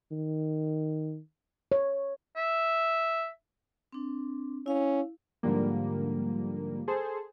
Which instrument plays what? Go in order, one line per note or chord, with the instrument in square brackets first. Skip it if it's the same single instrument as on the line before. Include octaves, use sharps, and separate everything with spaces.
[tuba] D#3
[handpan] C#5
[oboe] E5
[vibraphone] C4 D4
[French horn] C#4 [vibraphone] E4 F5
[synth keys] G#2 D3 F3 G3 A#3
G#4 A4 C5